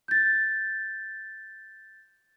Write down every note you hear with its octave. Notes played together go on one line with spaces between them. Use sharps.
G6 A6